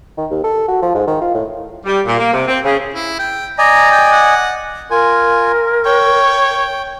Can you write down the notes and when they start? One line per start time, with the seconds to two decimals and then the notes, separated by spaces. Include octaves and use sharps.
0.17 D#3
0.31 D#2
0.44 A4
0.68 F#4
0.82 F3
0.94 G#2
1.07 D#3
1.21 F4
1.34 A2
1.85 G3
2.05 A#2
2.17 A#3
2.32 C3
2.47 C4
2.63 C#3
2.94 E4
3.19 G5
3.58 D5 D#5 G#5 A#5
3.92 G5
4.12 F#5
4.91 F4 A#4 G#5
5.86 C#5 G5